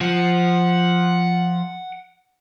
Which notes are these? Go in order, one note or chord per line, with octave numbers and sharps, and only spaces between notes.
F3 F#5